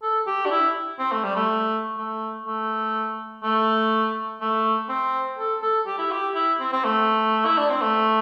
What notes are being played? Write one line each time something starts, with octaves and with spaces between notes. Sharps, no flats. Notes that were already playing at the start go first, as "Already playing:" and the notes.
A4
G4
D4
E4
C4
A3
G3
A3
A3
A3
A3
A3
C4
A4
A4
G4
E4
G4
E4
C4
C4
A3
E4
D4
C4
A3